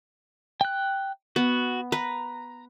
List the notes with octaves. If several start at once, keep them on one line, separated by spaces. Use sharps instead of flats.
G5 F#6
B3 F#4
B4 A#5